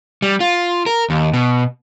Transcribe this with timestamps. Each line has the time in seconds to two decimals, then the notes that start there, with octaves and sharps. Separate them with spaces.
0.22 G3
0.40 F4
0.86 A#4
1.10 D#2
1.34 B2